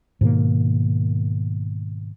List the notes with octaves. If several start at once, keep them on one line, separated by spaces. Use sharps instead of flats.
G#2 B2 D#3 A#3